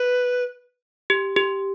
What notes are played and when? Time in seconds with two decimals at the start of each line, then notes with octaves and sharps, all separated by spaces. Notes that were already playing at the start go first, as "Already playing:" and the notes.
Already playing: B4
1.10 G4
1.36 G4